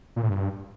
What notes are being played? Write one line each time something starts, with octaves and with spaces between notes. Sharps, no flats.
A#2
A2
G2